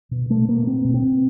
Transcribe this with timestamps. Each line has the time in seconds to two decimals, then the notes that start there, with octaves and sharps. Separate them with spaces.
0.11 B2
0.30 B2 A3
0.48 B2 A#3
0.66 B2 C4
0.84 B2
0.94 C4
1.03 B2